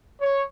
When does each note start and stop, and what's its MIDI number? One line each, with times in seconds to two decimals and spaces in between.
0.20 0.43 73